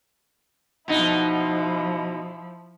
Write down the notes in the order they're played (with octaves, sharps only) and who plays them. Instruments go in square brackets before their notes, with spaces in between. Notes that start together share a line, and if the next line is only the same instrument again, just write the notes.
[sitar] B2 D#4 [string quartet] F3 E4